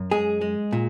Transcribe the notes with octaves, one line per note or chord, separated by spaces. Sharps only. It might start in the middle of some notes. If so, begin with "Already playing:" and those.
Already playing: F#2
G#3 G#4
G#3
A#2